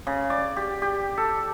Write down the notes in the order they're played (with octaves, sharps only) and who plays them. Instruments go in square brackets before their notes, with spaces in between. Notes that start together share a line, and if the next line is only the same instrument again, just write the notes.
[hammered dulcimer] C#3
D5
G4
G4
A4